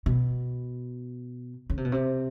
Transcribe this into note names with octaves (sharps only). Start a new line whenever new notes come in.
B2
C#3
C3
B2
C3